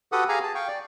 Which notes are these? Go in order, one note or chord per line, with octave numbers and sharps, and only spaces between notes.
F#4 G4 A4 B4 F#5 D#6
G4 G#4 F5 G#5 A#5
A5
F5 G5 C#6
D5